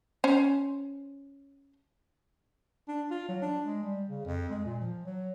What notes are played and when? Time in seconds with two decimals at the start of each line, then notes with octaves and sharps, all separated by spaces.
0.24 C#4 C5
2.88 D4
3.11 F4
3.29 F#3
3.42 D4
3.66 G#3
3.83 G3
4.09 C#3
4.26 F2
4.49 G#3
4.65 A#2
4.81 F3
5.05 F#3